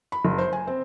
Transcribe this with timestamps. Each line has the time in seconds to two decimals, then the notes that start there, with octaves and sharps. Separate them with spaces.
0.12 B5
0.25 F#1
0.38 C5
0.53 G#5
0.67 C4